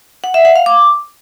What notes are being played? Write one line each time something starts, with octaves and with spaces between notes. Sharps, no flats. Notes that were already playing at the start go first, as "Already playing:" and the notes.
F#5
E5
F#5
F5
D6